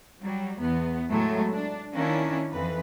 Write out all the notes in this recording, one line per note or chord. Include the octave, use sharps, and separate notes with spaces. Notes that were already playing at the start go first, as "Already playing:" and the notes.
F#3 G3
E2 B3
A2 F#3 G#3 A3
D4
D#3 A#3 C#4 D4 E4
F2 E3 B4